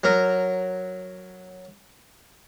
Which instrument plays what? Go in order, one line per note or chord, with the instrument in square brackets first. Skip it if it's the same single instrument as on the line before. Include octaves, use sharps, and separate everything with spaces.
[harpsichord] F#3 A#4